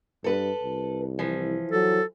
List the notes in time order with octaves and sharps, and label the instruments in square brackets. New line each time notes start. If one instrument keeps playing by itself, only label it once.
[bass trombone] G2 [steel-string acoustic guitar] A4 B4
[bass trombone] C2
[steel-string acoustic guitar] E3 F3
[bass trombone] F#3 [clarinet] A4